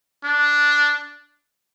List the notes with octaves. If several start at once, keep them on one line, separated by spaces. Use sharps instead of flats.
D4